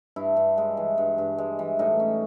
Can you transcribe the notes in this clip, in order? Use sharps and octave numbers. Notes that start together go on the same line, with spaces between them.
G2 E4
G2
G#3
E3
G2
G2
G#3
E3
A2 D#4
C#4